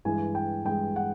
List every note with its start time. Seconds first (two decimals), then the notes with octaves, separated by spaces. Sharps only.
0.05 G2 E3 G#3 G#5
0.35 G5
0.65 G2 E3 G#3 G5
0.96 F#5